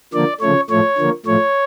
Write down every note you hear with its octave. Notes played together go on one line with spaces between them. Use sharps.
D3 F3 A#3 D5
C#3 F3 A3 C#5
A2 F3 A3 C#5
D3 F3 A#3
A2 F3 A3 C#5